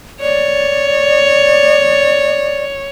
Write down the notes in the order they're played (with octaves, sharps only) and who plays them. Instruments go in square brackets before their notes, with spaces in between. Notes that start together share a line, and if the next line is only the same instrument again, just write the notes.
[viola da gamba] C#5 [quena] D5